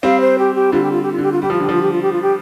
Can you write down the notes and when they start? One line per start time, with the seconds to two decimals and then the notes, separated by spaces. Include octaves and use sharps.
0.03 G3 C4 F5
0.20 C5
0.38 G4
0.55 G4
0.72 D3 G3 F4
0.82 G4
0.91 F4
1.02 G4
1.12 F4
1.18 D3 G4
1.32 F4
1.42 G3 G4
1.50 F3 F4
1.60 D3 G4
1.69 F3 F4
1.82 G4
1.92 F4
2.02 G4
2.12 F4
2.22 G4